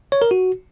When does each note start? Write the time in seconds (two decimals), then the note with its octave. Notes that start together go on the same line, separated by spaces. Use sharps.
0.12 C#5
0.22 A#4
0.31 F#4